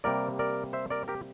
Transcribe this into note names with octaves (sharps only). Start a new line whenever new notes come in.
C3 G3 A#3 A#4 D5
A#4 D5
C5 E5
A#4 D5
G4 A#4